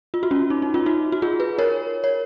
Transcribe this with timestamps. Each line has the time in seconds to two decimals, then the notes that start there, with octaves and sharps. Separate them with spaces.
0.14 F4
0.23 F#4
0.31 C#4 F4
0.50 D#4
0.62 D#4
0.74 C#4 F4
0.86 D#4 F#4
1.12 F#4
1.22 F4 G#4
1.40 G#4 B4
1.59 A#4 C#5
2.04 C#5